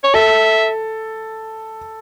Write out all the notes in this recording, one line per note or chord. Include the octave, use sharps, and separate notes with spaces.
C#5
A4 E5